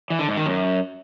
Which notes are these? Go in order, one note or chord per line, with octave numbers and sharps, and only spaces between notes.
E3
D3
G#2
D#3
F#2